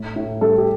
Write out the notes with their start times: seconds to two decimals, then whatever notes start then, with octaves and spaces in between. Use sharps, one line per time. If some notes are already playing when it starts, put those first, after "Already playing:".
Already playing: A2
0.16 A2
0.41 G3 A4
0.58 G4